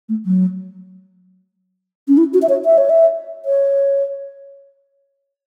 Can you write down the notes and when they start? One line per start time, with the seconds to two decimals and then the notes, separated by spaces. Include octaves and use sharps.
0.09 A3
0.26 F#3
2.08 C#4
2.17 E4
2.34 F#4
2.42 E5
2.49 C#5
2.65 E5
2.78 C#5
2.90 E5
3.45 C#5